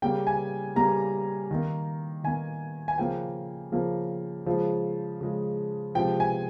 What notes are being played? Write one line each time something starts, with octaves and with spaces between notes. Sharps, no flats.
C#3 G3 A#3 G5
G#5
C#3 G3 A#3 A#5
D#3 A#3
D#3 A#3 G#5
G#5
C#3 F3 A#3 G5
C#3 F3 A#3
C#3 F3 G#3
C#3 F3 G#3
C3 F3 G#3 G5
G#5